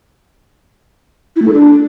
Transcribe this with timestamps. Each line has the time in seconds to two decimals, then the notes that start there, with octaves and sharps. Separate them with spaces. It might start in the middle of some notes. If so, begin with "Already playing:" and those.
1.36 E4
1.42 A3
1.47 A4
1.53 D4